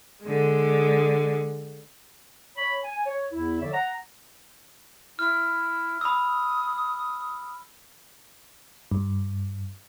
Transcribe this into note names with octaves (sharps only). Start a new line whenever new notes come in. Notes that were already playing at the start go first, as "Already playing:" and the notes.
D3 G#3
C#5 B5
G#5
C#5
E2 E4
D3 F3 C#5 D5 E5
F#5 A#5
E4 F6
B5 D#6 E6
G2